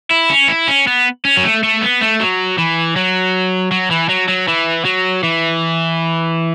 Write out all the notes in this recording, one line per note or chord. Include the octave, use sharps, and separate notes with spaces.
E4
C#4
E4
C#4
B3
C#4
F#3
A3
A3
B3
A3
F#3
E3
F#3
F#3
E3
F#3
F#3
E3
F#3
E3